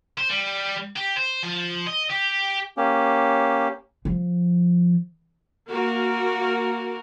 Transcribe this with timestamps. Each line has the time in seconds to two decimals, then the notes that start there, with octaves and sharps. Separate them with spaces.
0.18 C5
0.30 G3
0.96 G4
1.16 C5
1.43 F3
1.87 D#5
2.11 G4
2.77 A#3 C#4 G4
4.05 F3
5.69 A#3 F#4 A#4